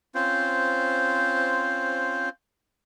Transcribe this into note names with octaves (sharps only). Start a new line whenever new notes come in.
C4 C#4 F4 C5